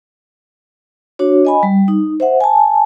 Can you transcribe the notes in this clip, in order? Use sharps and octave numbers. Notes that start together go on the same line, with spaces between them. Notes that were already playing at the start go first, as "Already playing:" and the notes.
D4 F#4 C#5
D#5 G#5 B5
G3
D#4
C5 E5 F#5
G#5 A5